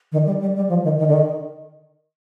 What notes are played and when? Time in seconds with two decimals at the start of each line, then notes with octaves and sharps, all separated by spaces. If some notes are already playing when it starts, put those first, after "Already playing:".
0.12 D#3
0.26 G3
0.40 G3
0.55 G3
0.69 F3
0.84 D#3
0.98 D#3
1.08 D3
1.13 D#3